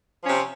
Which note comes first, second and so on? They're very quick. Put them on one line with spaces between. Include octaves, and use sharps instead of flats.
F3 C#4 C3